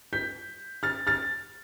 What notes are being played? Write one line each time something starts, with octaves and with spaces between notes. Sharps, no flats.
G6 B6
F6 A6
F6 A6